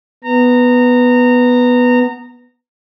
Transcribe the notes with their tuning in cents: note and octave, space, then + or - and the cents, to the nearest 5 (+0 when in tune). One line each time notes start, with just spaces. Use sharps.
B3 +0 A#5 -20